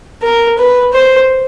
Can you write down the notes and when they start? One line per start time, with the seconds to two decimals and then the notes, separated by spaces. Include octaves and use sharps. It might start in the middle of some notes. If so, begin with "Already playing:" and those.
0.22 A#4
0.58 B4
0.93 C5